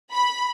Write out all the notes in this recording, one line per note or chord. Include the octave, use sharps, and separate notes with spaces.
B5